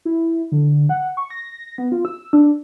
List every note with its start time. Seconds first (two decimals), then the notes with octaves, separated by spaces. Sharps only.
0.05 E4
0.52 D3
0.89 F#5
1.17 C#6
1.30 A#6
1.78 B3
1.92 F4
2.05 E6
2.33 D4